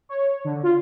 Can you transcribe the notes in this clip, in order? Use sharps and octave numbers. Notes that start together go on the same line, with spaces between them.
C#5
D3
F4